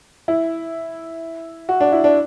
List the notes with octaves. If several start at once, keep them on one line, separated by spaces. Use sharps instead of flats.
E4
F#4
D4
E4
D4